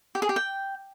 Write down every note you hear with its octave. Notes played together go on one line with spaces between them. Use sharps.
G4
G#4
G4
G5